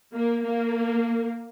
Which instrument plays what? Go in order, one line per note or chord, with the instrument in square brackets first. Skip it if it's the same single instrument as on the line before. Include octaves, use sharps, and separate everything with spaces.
[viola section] A#3
A#3